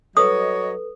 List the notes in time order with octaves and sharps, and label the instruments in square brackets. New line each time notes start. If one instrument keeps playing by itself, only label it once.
[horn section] F#3 C#5 D#5 [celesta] A4 B4 [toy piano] D#6